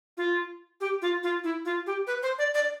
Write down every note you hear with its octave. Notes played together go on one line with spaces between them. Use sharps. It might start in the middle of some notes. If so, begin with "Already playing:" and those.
F4
G4
F4
F4
E4
F4
G4
B4
C5
D5
D5